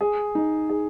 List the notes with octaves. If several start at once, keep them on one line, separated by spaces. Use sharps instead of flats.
G#4
D#4
G#4